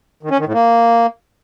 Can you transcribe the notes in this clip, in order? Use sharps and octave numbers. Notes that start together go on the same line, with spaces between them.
D#3
C#4
D#3
A2
A#3